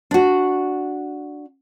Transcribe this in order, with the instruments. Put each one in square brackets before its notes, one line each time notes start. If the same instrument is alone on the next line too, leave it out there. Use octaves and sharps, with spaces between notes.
[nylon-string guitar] D4 F#4